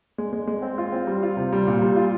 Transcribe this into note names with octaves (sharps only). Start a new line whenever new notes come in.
G#3
G#3
G#3
C4
F4
C4
G3
F4
C3
G3
A#2
G3
F4